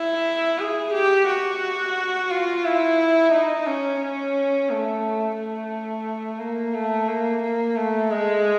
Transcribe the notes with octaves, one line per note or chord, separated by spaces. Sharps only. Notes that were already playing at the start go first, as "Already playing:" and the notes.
Already playing: E4
G#4
G4
F#4
F4
E4
D#4
C#4
C#4
A3
A3
A#3
A3
A#3
A#3
A3
G#3